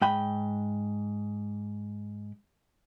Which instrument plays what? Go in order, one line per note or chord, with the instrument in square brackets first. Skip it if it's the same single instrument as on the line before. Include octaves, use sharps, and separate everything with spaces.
[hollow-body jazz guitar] G#2 G5 B5